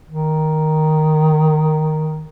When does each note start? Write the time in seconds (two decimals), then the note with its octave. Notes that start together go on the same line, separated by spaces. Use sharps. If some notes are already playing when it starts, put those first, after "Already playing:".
0.10 D#3